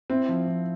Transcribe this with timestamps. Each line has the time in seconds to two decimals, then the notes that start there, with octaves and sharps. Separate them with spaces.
0.10 C4 E4
0.29 F3
0.48 F3